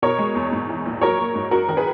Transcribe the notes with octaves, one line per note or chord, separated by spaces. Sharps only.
B2 A#4 C#5
G#3
E2
G#2
E3
A#1
F#3 A#4 C#5
A#3
G#2
F#2 F#4 A#4
D#3 A#4
G#4 B4